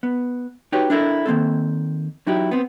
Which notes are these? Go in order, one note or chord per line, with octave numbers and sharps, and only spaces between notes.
B3
D#4 F#4 G4 B4 C#5
D4 E4 A4 A#4
D#3 A#3 C4 A4
F#3 D#4 E4 F#4 G4
B3 C4